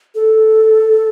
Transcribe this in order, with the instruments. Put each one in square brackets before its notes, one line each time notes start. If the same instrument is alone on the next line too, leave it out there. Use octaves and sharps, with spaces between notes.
[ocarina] A4